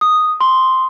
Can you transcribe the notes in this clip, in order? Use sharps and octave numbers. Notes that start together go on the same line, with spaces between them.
D#6
C6